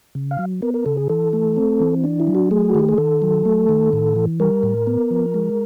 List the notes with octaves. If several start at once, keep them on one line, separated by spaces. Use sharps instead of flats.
C#3
F5
F#3
B3 A#4
A#4
C#3 A4
G#4
E3 A4
A3
C4
E3
D4
E4
F#3
F#4
A3 G#4
F#4
D#3 G4
G#4
D#3 A4
F#3
A3
D#3
A2
E3
G3 A#4
A2
B3
F3
G#3